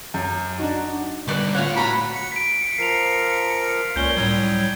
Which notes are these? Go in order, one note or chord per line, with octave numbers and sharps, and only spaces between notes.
F#2
D4 D#4 F#4
D3 G3 B4 D5 D6
A2 F4 C#5 F5 F#5
F#4 A#5 B5
C#7
B6 D7
F3 A#4 C7 D7 F7
C#2 A#2 C#4 G6 G7
A2 F#3 G3 D#6 G#6